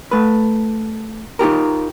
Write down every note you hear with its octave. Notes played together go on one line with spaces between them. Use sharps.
A3 B4
D#4 F4 G4 A#4